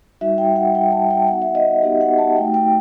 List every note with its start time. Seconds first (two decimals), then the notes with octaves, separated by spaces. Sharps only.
0.21 G3 D#4 F#4 E5
0.38 G5
0.56 F#5
0.74 G3 D#4 F#4 G5
0.92 A5
1.10 G5
1.28 B3 D#4 F#4 F#5
1.42 E5
1.55 D#5
1.82 B3 D#4 F#4 G4
2.01 F#5
2.18 A5
2.36 A3 D#4 F#4 G5
2.54 G5